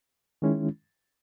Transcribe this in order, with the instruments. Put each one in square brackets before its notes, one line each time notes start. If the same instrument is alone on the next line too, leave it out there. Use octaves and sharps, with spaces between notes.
[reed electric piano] D#3 G#3 C#4 E4